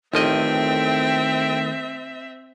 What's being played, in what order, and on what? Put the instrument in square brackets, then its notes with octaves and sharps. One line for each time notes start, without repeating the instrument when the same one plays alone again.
[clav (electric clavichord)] A1 F3 D#5 [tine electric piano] D#3 A3 [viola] C4 E5 [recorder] G5